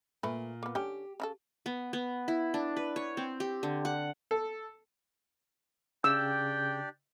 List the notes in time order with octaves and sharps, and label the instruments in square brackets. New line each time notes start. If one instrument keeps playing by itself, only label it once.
[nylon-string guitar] A#2 [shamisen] A3 B4
[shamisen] A#3 B3
[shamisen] D3 C#4 G5 [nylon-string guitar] G4
[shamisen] C#3 E4 A4
[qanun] B3
B3
E4
D4
B4
C#5
C4
G4
D3
F#5
[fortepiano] A4
[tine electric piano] C#3 [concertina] D4 G4 D5 [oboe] G5 [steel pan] E6